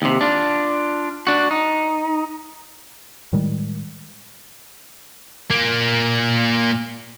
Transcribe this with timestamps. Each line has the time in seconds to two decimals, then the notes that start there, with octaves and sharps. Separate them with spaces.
0.02 D#2 C3
0.21 D4 F4
1.27 D4 F#4
1.51 D#4
3.33 A2 D#3 G3 G#3
5.51 A#2 A#3